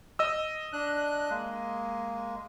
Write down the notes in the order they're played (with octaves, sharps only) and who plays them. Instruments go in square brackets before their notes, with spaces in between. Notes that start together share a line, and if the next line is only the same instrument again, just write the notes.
[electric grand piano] D#5 E6
[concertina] D4 F#6
G#3 A#3